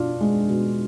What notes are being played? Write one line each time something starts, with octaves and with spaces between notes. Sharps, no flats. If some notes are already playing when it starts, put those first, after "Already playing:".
Already playing: B2 D4 F4
G#3
B2